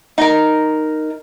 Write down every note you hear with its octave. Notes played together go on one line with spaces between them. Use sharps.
D#4 A#4